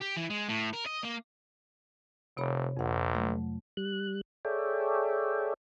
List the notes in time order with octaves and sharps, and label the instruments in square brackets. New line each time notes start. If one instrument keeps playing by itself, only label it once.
[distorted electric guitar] G4
E3
G#3
A2
A#4
D#5
A#3
[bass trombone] F1 [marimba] C3 C#5 B5
[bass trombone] A#1 [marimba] F2 F#5
[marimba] F#3 A3
[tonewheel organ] G3 F#6
G#4 A4 C#5 D5 E5 G5